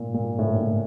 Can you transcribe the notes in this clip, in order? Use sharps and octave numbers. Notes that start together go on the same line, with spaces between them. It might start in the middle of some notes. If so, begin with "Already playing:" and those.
Already playing: A#2
A#2
A2
A#2
A2